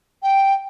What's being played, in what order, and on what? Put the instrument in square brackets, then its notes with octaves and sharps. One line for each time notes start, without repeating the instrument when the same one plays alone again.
[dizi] G5